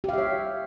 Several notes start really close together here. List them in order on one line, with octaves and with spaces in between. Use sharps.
G4 F5 E5 C#5